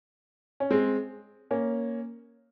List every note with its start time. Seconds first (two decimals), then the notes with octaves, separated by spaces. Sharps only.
0.60 C#4
0.71 G#3 C4
1.51 A#3 C#4